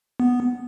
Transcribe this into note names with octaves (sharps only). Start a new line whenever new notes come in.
B3